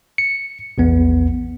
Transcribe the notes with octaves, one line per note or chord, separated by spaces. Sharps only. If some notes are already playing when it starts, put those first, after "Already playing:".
C#7
A#1 E2 B3